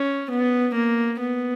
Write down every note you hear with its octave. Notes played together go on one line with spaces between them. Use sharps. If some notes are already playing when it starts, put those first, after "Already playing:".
Already playing: C#4
B3
A#3
B3